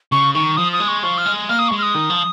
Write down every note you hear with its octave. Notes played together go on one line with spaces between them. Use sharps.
C#3 C#6
D#3 C#6
F3 D#6
D#6
G#3
C#6
F3 C#6
F6
G#3
A#3 F6
D#6
G#3 C#6
F6
D#6
D#3
F3